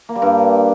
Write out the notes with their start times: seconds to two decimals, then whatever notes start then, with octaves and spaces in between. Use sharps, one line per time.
0.09 A#3
0.15 G3
0.22 G2